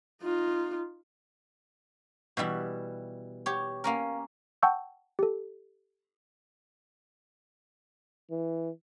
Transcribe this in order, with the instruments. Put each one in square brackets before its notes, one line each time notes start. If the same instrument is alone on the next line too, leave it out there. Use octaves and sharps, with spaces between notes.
[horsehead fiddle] D#4 F4
[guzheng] B2 E3 G3 E4
G4 C#5
A#3 C#4 A#4
[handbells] F#5 G5 A5 C#6 E6 G6
G4 A4
[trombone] E3